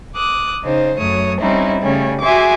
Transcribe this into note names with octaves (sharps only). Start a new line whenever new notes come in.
D6 D#6 F#6
C#3 D#4 C5
F#2 F#3 A3 C#5 D#6
G3 C4 C#4 D#4 E4
C#3 G3 A3 C#4
F#4 G#4 E5 G#5 C6 D6